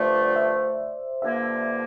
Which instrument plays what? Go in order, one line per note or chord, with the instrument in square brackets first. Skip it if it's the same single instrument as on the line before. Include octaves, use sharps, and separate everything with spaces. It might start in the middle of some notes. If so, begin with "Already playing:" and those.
Already playing: [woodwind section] G2 D3 F3 A3 [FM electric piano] C5 D5
[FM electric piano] E5
[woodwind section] G2 D3 F3 A#3 [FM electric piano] E5